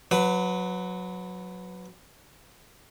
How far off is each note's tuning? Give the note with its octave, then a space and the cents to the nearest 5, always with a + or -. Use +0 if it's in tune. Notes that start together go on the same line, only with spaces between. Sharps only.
F#3 -15 B4 +15